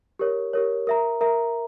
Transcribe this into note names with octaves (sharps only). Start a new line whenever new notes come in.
G4 A#4 C#5
G4 A#4 C#5
A#4 E5 A#5
A#4 E5 A#5